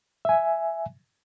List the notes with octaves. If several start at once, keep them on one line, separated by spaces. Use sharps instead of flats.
E5 G#5